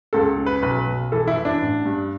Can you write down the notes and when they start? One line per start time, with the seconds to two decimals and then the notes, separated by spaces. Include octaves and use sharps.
0.13 C#2 A4
0.37 C#3
0.46 B4
0.63 B1 B4
0.87 B1
1.12 E3 A4
1.27 E4
1.37 E3
1.45 D4
1.61 A1
1.86 G2